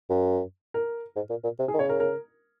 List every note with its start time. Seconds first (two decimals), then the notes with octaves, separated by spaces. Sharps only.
0.10 F#2
0.74 A#4
1.16 G#2
1.30 A#2
1.44 A#2
1.59 C3
1.68 G#4
1.74 D#3
1.79 C#3 C#5
1.89 A#4
2.00 A#4